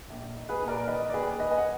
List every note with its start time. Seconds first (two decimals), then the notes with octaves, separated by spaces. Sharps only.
0.10 A#1
0.36 D#4
0.49 G#4 B4
0.62 A#2
0.68 A#4 D5
0.87 D#3 B4 D#5
1.09 D5
1.14 D#2 G#4 B4
1.40 D#3 B4 D#5
1.51 G#5
1.58 F#5